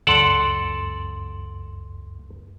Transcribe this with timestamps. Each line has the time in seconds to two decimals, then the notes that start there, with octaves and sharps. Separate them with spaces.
0.07 C#2 F#2 A4 D5 F#5 C6